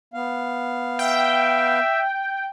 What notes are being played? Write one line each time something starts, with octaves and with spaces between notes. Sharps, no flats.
B3 F5
E5 G5